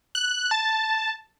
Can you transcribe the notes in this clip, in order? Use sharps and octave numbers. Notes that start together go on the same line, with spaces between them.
F#6
A5